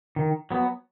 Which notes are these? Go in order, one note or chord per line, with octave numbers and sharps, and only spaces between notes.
D#3
F#3 B3